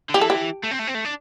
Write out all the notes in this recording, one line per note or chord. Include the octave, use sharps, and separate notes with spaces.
D3
E3 G4
A4
G4
A3
C4
A3
C4
A3
D4